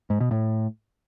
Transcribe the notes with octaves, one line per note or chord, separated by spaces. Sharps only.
G#2
B2
A2